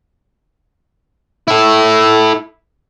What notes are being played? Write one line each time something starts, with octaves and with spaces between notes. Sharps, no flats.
E4 A4